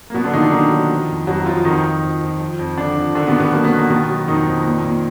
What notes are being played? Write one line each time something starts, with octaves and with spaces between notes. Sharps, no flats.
A#3
B2 F#3 B3
D3 D4
A#2 D#3 D#4
D3 D4
D#3 F#3 D#4
F#3
F3
F2
F2 F#3 F#4
F3 F4
F2 D#3 D#4
F2
F2
F2
F3
F2
D3 F3 D4
F2
D3 D#3 D4
B2 B3
D#3
B2 B3
F#3 A#3
B3
D#3 A#3
B2 D#3 B3
F#3
F2 D#3 D#4
F2
A#2
A#2